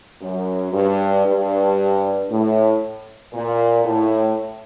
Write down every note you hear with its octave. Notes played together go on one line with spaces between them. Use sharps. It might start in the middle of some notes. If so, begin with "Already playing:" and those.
F#2
G2
G2
A2
A#2
A2